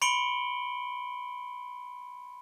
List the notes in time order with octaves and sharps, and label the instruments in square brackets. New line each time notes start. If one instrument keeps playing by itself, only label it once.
[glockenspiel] B5 C6 C#7 D7 F#7 G7